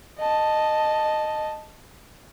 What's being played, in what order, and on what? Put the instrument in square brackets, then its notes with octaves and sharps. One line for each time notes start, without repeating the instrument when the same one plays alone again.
[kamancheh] D#5 A5